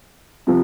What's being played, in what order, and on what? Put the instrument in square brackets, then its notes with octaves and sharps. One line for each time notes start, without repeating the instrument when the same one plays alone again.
[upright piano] C3 F3